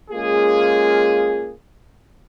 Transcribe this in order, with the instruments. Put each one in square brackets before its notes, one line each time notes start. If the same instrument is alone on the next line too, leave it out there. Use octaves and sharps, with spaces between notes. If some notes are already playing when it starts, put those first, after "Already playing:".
[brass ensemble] G#3 A#3 C#4 F4 G#4